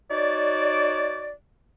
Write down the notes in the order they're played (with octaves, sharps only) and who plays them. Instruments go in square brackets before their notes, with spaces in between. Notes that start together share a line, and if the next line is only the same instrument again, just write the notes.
[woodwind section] D#4 F#4 C#5 D5